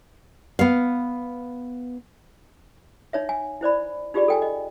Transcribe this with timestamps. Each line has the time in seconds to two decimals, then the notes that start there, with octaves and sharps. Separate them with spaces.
0.59 B3 F5
3.13 D#4 C#5 E5
3.29 G#5
3.61 E4 C5 D5 B5
4.14 D#4 F4 G4 G#4 D5 B5
4.28 A4 G5 G#5
4.42 D#5